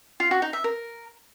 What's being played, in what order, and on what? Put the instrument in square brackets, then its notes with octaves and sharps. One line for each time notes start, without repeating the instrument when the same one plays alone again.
[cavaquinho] F4
F#4
D#4
E5
A#4